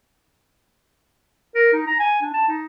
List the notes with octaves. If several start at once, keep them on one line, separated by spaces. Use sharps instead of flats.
A#4
D#4
A#5
G#5
D4
A5
D#4